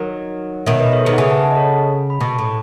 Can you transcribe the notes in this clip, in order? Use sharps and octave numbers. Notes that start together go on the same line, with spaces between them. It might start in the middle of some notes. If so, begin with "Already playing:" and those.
Already playing: D#3 F#3
B2 D#3 C#5 E5
B4 D#5
A4 C#5
D#3 G#4 B4
F#5
C#3 E5 G#5
F#5 A5
F#5 A5
D#5
A4 C#5
B5
B2 A5 C#6
A2